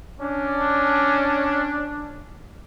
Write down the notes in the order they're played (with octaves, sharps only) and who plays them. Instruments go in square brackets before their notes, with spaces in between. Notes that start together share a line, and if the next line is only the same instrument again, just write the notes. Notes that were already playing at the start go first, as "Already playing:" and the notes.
[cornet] C#4 [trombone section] D4